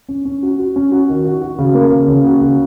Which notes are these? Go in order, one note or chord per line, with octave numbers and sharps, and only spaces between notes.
C#4
C#4
F#4
F#4
C#4
F#4
D#3
F#4
F#4
C#3
A#3
C#3
C#3
F#4
C#3